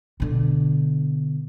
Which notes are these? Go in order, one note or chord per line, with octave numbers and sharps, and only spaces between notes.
B2 D3